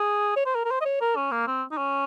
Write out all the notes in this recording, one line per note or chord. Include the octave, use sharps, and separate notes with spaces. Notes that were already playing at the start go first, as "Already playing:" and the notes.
Already playing: G#4
C#5
C5
A#4
A#4
C5
D#5
C#5
A#4
C#4
A#3
C4
D#4
C#4